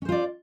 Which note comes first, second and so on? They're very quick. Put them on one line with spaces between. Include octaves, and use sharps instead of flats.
C#4 C5 F4 D5